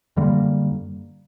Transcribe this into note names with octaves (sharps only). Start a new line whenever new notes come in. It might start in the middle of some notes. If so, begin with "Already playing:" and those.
F#2 D3 G3 A#3